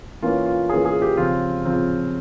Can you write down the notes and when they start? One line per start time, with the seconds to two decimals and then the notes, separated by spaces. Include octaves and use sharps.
0.22 E3 A#3 C#4 F4
0.46 F4
0.69 E3 A#3 C#4 G#4
0.85 G#4
1.02 G4
1.17 C#3 F3 C4 F4
1.65 C#3 F3 C4